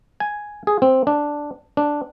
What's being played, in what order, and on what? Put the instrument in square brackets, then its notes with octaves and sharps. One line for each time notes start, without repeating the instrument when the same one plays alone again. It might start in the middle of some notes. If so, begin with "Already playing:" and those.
[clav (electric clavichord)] G#5
G#4
C4
D4
D4